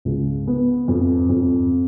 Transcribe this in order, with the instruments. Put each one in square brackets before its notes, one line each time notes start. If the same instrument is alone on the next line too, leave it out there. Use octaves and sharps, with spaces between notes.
[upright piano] C#2
B3
F2
F2